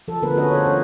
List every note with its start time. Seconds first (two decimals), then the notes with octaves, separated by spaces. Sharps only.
0.08 F3 A4
0.22 D3 A3 B3 A#4 B4
0.37 C#4 F#4 G#4 B4 D#5
0.51 A4 C5 C#5
0.66 F3